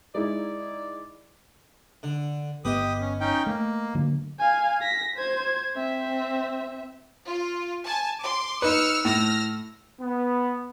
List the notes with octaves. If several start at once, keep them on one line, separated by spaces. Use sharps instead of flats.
G#3 D#4 E4 D5
D3
G1 B3 G4 B4 D#5 D#6
C#4
C#4 D#4 G5
A3 A#3
D3 F#3 A#3
F5 G#5
A#6 B6
C5 G#6
C4 E5
F4
G#5 A5
C6 D6
D#4 B4 E6 F6 C#7
A2 E6 F6 A#6
B3